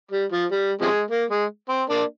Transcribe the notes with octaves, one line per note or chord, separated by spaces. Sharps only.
G3
F3
G3
C3 F3 G#3
A#3
G#3
C4
A#3 D4